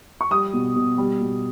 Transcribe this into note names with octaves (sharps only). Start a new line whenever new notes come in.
C#6
G3 D#6
B2
B2
G3
B2